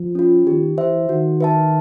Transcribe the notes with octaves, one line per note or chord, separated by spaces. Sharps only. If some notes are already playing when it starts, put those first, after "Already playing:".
Already playing: F3
C#4 F4
D#3 G4
E3 C5 E5
D#3 F#4
B4 E5 A5